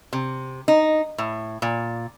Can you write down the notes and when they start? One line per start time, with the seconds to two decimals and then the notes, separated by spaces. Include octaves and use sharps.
0.13 C3
0.68 D#4
1.18 A2
1.62 A#2